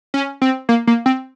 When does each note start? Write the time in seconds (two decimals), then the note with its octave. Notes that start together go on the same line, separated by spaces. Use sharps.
0.14 C#4
0.42 C4
0.69 A#3
0.87 A#3
1.06 C4